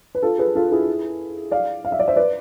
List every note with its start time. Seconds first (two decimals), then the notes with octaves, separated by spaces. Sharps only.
0.15 B4
0.22 F4 A4
0.38 G#4 B4
0.55 F4 A4
0.71 E4 G#4
1.51 D5 F5
1.85 F5
1.92 E5
1.99 D5
2.08 C5 E5
2.16 B4 D5